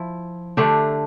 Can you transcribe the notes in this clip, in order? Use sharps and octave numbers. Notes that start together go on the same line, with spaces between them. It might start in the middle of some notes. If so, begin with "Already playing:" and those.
Already playing: F3 E4
D3 A3 D4 G4